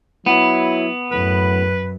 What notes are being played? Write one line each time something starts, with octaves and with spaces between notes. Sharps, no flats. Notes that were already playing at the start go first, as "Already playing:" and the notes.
F#3 B3 E4
F#2 A2 B4